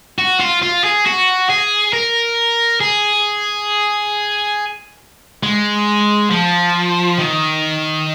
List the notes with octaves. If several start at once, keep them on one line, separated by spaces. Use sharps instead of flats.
F#4
F4
F4
G#4
F#4
G#4
A#4
G#4
G#3
F3
D#3